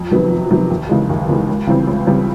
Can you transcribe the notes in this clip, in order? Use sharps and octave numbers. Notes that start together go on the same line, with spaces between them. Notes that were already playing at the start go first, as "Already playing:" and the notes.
Already playing: F2
C3 D#3 F#3 B3
F2
C3 D#3 F#3 B3
D#2
C#3 E3 G#3
D#2
C#3 E3 G#3
C#2
C#3 E3 G3 C4
C#2
C#3 E3 G3 C4